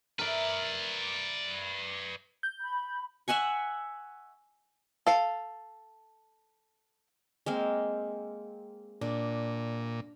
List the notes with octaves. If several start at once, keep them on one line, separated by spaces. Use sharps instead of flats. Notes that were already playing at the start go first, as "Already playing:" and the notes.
A#4 B4 D5 E5
G6
B5
E5 F#5 G#5 C#6
A4 F5
G#3 A#3 C4
A#2 D4